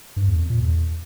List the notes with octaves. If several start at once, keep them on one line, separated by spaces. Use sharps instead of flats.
G2
E2
F2
A#2
E2